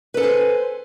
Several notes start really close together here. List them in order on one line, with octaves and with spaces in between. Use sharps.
B4 A4 G#5 C5